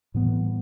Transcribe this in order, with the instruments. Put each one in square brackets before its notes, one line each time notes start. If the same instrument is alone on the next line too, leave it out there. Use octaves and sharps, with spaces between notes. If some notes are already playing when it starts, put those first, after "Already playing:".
[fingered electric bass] A2 E3 G3 B3